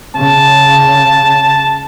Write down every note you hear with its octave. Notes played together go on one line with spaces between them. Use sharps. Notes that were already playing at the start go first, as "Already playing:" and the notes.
C#3 A5